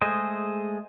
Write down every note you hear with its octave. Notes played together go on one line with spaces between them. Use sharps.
G#3 A3 G#4 C5 D#5